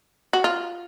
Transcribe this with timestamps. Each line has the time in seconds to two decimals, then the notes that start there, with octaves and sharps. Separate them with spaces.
0.33 F#4
0.44 F4